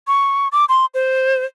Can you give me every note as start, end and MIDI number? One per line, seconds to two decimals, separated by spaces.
0.07 0.48 85
0.52 0.65 86
0.69 0.86 84
0.94 1.44 72